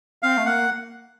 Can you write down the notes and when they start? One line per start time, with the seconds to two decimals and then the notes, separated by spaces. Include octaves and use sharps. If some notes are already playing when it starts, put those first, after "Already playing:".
0.22 C4 F5
0.37 A3
0.45 A#3 F#5